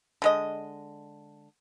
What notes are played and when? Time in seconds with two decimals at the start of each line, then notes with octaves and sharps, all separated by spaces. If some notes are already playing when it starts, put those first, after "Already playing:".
0.22 D3 G#3 D#5